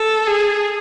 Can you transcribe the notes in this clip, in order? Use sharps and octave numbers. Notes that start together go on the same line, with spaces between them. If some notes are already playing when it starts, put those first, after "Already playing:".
Already playing: A4
G#4